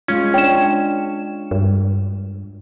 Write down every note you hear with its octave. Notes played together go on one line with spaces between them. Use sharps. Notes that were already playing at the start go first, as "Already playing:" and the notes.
G#3 C#4 F4
D4 C#5 G5 E7
G2